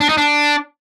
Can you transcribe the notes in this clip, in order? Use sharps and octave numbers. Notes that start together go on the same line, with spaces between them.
D4
D#4
D4